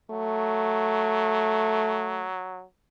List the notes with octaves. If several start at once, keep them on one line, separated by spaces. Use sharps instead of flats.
F#3 A3